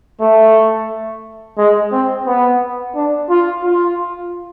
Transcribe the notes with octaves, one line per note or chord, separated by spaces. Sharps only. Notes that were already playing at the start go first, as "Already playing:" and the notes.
A3
G#3
C4
B3
D4
F4
F4